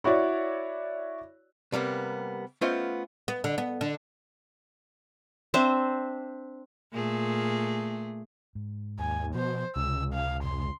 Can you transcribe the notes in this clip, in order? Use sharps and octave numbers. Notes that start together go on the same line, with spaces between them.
E4 F#4 C#5 D5
C3 G3 A#3 B3
A3 B3 C#4 F4 C5 D#5
B3
D3
B3
D3
C4 D4 C5 E5
A#2 A3 G#4
G#2
D#2 G#5
B2 F3 C5
C#2 C3 E6
F5
F2 C3 C6